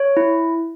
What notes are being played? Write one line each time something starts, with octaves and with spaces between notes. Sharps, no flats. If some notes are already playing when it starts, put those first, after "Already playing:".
Already playing: C#5
E4